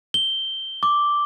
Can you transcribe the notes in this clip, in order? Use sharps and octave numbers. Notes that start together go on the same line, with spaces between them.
G7
D6